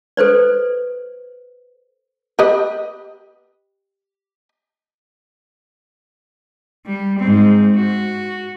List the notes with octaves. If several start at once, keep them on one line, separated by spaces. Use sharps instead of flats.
A4 B4 C5 D5
G4 B4 D#5
G3
G#2 C4
F#4